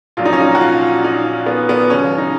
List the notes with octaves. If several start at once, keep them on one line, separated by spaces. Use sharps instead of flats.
A#1 A#2 F#3 F4
D#4
C#4
D#4
F#4
F4
D#4
B3
B3
D#2 C#3 F#3 C#4
D#4